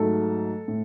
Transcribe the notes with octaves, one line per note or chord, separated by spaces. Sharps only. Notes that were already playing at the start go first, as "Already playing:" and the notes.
Already playing: G#2 F#3 A3 A4
A2